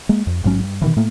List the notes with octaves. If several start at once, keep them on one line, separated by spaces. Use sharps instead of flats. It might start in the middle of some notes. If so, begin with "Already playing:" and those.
G#3 A#3
F2
A1 G#2 F#3 C#4
G2
B2 D#3 E3
A2 A3 A#3